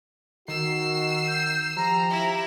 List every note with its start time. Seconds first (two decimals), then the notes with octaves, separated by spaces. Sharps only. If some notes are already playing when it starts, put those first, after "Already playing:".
0.48 D#3 F#4 E6 C7
1.28 G6
1.77 F3 G4 A#5
2.10 E4